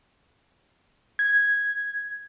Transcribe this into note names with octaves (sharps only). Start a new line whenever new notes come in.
G#6